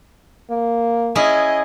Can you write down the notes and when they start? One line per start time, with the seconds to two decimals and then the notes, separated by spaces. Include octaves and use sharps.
0.50 A#3
1.15 C#4 E4 G#4 D#5